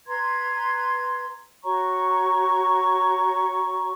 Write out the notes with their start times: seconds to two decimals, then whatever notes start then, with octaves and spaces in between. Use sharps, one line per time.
0.06 B4 A#5 C6 G#6
1.64 F#4 C#5 A#5 C#6